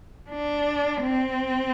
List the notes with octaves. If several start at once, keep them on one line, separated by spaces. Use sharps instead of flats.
D4
C4